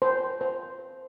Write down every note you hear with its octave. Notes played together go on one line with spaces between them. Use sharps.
C5
C5